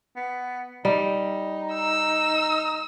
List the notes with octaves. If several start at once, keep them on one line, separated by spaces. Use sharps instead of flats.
B3
G3 D#4
E6